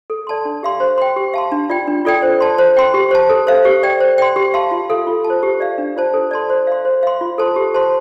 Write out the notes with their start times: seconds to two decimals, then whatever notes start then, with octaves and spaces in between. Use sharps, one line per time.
0.10 A4
0.27 D5 A5 C6
0.45 D4
0.63 G4 F5 C6
0.80 C5
0.98 G5 C6
1.16 G4
1.34 F5 A5 C6
1.52 D4
1.70 F4 D5 G5
1.87 D4
2.05 F4 A4 D5 G5
2.22 C5
2.40 A5 C6
2.58 C5
2.77 G5 C6
2.94 G4
3.11 C5 A5
3.29 A4
3.47 C5 F5
3.65 G4
3.83 D5 G5
4.00 C5
4.18 G5 C6
4.36 G4
4.54 F5 A5 C6
4.71 F4
4.90 A4 F5
5.07 F4
5.24 A5
5.30 C5
5.43 G4
5.60 D5 F5
5.78 D4
5.96 F4 C5 A5
6.14 A4
6.31 D5 A5 C6
6.50 C5
6.67 F5 C6
6.85 C5
7.03 F5 C6
7.21 F4
7.38 A4 C5 A5 C6
7.56 G4
7.74 C5 A5 C6